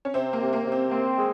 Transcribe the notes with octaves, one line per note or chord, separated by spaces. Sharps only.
C#4
C3 C4
A#3
C3
A#3
C3
C4
A#3 C4
G#3